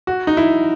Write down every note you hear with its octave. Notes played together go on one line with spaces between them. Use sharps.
F#4
D#4
E4